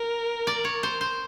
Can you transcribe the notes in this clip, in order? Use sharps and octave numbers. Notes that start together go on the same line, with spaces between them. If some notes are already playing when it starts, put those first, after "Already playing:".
Already playing: A#4
D5
C#5
C5
C5